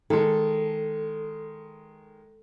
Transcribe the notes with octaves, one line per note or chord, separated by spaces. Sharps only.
D#3 G#3 A4